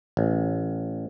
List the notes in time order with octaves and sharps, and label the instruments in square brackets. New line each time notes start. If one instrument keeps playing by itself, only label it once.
[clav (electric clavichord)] A1